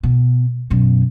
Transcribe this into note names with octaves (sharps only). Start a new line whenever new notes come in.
B2
F#2 B2